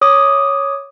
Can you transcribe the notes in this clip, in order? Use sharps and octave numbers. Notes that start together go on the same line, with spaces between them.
C#5 D6 D#6